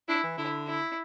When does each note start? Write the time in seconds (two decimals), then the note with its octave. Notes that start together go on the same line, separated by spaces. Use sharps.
0.08 D4 E4
0.23 E3
0.38 D3 E4
0.67 E4